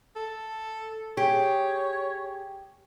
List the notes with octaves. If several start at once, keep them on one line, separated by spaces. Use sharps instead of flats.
A4
G4 G#4 C#5